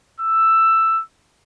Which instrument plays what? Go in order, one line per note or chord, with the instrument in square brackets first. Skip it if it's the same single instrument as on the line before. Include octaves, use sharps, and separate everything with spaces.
[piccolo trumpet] E6